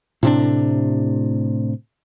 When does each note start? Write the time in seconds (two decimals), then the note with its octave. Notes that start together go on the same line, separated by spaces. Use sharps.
0.23 A2 C3 D4